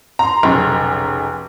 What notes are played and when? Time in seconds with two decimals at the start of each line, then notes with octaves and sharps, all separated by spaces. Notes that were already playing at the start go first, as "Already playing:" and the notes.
0.19 A#5 C6
0.43 F1 B1 C#3